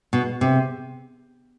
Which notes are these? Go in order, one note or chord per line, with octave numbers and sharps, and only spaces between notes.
B2
C3